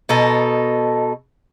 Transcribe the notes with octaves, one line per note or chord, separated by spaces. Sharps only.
B2 D#4 A4